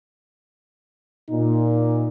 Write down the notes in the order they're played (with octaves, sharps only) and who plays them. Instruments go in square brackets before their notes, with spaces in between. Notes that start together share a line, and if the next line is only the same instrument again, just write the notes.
[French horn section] A#2 D#4